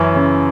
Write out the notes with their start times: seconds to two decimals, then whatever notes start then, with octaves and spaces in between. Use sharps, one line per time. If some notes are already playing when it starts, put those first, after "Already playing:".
Already playing: F#2 E3 C#4 E4
0.15 C#3